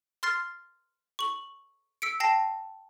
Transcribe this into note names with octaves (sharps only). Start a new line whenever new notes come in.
C6 F6 A6 C7
C#6 F#7
E6 B6 C#7 D7
G5 A5 A#6 C7